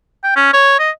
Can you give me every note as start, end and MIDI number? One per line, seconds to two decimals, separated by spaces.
0.24 0.31 79
0.36 0.51 61
0.53 0.77 73
0.79 0.90 75